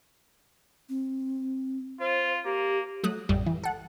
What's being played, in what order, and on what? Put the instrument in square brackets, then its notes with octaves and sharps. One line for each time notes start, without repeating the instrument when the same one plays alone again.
[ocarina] C4
[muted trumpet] F4 [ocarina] C5
[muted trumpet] A#3 [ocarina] G4
[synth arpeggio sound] F#3 A3 D#6 F#6
A1 F2 G3
E3
A4 F#5